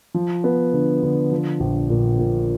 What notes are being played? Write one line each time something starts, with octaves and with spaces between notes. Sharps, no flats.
F3
B3
D3
D3
F3
A#1
A#2
A#2